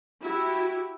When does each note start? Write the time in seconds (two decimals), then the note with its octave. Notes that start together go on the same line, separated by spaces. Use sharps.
0.21 E4 F#4 G4